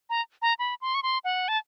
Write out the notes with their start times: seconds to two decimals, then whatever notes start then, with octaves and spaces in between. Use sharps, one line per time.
0.10 A#5
0.42 A#5
0.59 B5
0.82 C6
0.95 C#6
1.03 C6
1.25 F#5
1.48 A5